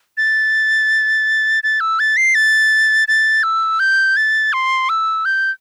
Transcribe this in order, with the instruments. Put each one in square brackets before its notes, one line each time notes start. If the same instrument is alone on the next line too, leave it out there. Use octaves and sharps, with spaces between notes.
[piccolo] A6
A6
E6
A6
C7
A6
A6
E6
G6
A6
C6
E6
G6